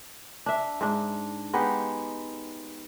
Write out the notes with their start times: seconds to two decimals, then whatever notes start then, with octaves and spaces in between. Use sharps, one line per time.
0.46 D4 E5
0.81 G#2 D4
1.53 G#3 B3 D#4 G4